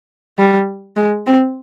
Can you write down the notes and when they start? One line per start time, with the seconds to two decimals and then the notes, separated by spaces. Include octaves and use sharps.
0.38 G3
0.96 G#3
1.26 C4